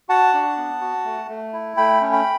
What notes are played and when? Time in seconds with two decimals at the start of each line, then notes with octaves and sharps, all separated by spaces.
0.09 F#4 F#5 A5
0.34 D4
0.57 B3
0.81 F#4
1.05 A3
1.29 A3
1.53 E4
1.77 A3 G5 B5
2.01 C#4
2.12 G5 B5